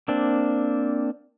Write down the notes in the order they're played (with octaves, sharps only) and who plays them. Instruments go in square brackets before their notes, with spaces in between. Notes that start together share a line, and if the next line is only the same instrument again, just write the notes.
[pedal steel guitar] A#3 C4 D4